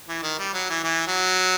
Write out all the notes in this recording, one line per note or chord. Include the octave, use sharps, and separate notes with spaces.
E3
D#3
G3
F#3
E3
E3
F#3